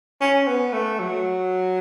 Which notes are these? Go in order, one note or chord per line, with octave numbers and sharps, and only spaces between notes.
C#4
B3
A3
F#3